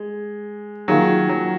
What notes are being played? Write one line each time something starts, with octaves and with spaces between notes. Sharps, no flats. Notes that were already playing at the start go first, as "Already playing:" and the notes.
Already playing: G#3
D#3 F#3 A#3 F4 G#4
F#3